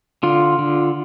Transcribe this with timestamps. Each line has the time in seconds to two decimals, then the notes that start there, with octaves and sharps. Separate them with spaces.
0.23 D3 F4
0.59 D3